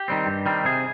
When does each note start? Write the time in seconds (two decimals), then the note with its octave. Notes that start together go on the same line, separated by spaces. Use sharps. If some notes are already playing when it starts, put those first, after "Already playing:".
Already playing: G4
0.08 D#3 G3 C4
0.26 G2
0.46 D#3 G3 C4
0.65 C3 G#4